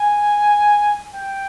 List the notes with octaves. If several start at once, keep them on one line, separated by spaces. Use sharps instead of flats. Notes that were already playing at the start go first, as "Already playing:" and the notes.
Already playing: G#5
G5